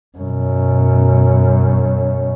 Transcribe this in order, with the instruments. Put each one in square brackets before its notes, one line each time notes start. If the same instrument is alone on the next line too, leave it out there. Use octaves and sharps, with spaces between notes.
[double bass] F#2 B2